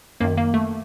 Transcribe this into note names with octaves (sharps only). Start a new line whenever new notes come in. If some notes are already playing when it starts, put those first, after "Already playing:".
F#2 D#3 A#3
A#3
A3